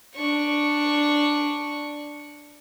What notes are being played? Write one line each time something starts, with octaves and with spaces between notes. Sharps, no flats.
D4 C#6